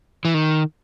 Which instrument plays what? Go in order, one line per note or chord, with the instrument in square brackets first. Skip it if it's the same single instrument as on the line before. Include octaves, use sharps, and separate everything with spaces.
[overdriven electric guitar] E3
D#3